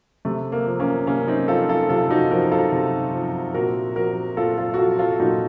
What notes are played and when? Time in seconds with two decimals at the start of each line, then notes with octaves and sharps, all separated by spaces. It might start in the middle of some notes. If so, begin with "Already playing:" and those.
0.25 C3 A3
0.52 A#3
0.66 F3
0.80 A#3 C#4
1.07 C3 A#3 C#4
1.28 C4 D#4
1.48 F3 F4 A4
1.69 F4 A4
1.89 C3 F4 A4
2.11 D#4 F#4
2.31 F3 F#4 A#4
2.51 F4 A4
2.72 C3
3.14 F3
3.54 A#2 F#4 A#4
3.96 F3 F#4 A#4
4.37 A#2 F4 A4
4.58 F4 A4
4.74 F#4
4.78 F3 F4 A4
4.99 F4 A4
5.20 A#2 D#4 F#4